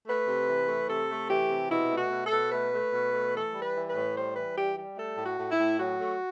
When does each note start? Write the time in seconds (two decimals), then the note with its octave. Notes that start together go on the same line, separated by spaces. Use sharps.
0.06 A3 B4
0.27 C3
0.48 E3
0.68 A3
0.88 C3 A4
1.09 A3
1.29 E3 G4
1.49 C3
1.70 B2 E4
1.90 A3
1.97 F#4
2.10 B2
2.24 A4
2.31 B2
2.52 A3 B4
2.72 A3
2.93 B2
3.13 A3
3.33 E3 A4
3.54 G3
3.60 B4
3.74 E3
3.88 B4
3.95 A2
4.15 G3 C5
4.36 E3 B4
4.56 G3 G4
4.77 G3 G4
4.97 A3 A4
5.17 A2
5.24 F#4
5.38 A2
5.51 E4
5.58 A2
5.79 F#3 F#4
5.99 A3